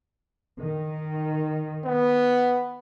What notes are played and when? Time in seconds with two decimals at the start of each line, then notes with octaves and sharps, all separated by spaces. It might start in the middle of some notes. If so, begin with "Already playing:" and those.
0.61 D#3
1.85 B3